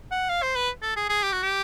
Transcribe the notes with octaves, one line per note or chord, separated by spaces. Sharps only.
F#5
F5
C5
B4
A4
G#4
G#4
G4
F#4
G4